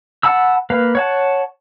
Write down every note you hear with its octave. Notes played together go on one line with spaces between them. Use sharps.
F#5 A5 B5 E6
A#3 B4 F5
C#5 F#5 A5